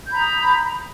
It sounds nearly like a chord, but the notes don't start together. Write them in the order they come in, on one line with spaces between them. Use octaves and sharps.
G6 B5 A#5 D#6